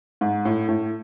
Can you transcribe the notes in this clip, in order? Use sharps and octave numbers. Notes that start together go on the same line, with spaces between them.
G#2
A2
A2